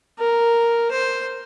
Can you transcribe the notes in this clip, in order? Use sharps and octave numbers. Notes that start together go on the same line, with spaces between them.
A#4
C5